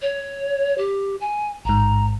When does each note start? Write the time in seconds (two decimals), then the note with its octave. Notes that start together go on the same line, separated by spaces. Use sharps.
0.02 C#5
0.78 G4
1.21 G#5
1.65 A1 G#2 A#5